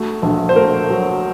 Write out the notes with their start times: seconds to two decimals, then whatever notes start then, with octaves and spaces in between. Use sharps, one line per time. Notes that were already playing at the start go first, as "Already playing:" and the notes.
Already playing: A3 F#4
0.22 A#1
0.49 C5
0.56 A3 A#4
0.90 F#3